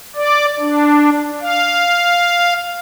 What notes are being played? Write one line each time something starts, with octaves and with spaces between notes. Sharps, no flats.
D5
D4
F5